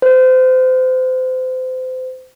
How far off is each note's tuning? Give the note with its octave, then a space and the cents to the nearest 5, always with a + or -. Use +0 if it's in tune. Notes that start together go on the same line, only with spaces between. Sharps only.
C5 -30